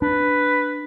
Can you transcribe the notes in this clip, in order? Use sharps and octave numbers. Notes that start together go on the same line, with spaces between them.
D4 B4